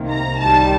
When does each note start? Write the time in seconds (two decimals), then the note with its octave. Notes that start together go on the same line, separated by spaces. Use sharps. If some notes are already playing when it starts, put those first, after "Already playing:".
Already playing: C2 C3 D#3 A#3
0.09 A#5
0.39 C2 C3 D#3 G3 A5